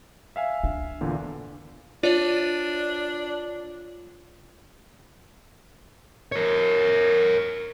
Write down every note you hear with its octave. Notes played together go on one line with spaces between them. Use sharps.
E5 F5 G#5
D4
E2 A#2 D3
D4 F4 C#5 D5
A#4 C#5